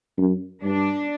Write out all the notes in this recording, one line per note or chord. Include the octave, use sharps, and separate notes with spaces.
F#2
G2 D4